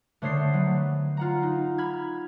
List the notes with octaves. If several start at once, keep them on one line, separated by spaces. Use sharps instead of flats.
D3 A3 C5 C#5 D#6 C7
F#3 B3
F4 F#5 A#5
D#4
B5 F6 G#6